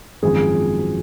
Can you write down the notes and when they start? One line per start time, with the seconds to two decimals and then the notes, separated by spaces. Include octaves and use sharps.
0.22 G#1 F#2 F3 G#4